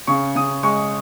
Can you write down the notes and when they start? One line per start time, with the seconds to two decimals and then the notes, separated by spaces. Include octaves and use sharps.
0.07 C#3 C#6
0.36 C#3 D#6
0.63 G#3 C#6